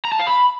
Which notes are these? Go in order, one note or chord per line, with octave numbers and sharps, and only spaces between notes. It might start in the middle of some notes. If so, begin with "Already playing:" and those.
A#5
A5
F5
B5